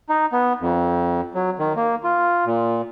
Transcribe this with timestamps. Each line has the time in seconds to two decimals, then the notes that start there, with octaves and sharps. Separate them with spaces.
0.09 D#4
0.32 B3
0.60 F2
1.34 F#3
1.59 D#3
1.76 A#3
2.04 F4
2.45 A#2